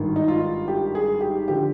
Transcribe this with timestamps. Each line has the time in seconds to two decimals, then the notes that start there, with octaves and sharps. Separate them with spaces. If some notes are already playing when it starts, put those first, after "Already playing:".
Already playing: G#1 G2 D#3
0.16 D#4
0.28 F4
0.68 G4
0.95 G#4
1.21 G4
1.48 D3 F3 G4